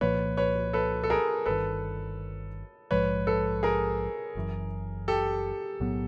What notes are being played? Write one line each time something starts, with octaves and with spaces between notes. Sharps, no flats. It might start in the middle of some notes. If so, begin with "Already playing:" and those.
C2 A#2 F3 A#3 B4 C#5
B4 C#5
A4 B4
A4
G#4 A#4
G1 G2 D#3 A4 B4
A#1 G#2 F3 G#3 B4 C#5
A4 B4
G#4 A#4
F#1 F#2 C#3 E3
G4 A4
B1 A2 F#3 B3